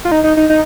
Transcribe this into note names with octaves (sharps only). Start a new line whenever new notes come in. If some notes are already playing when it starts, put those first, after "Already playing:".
F4
D#4
D#4
D#4
D#4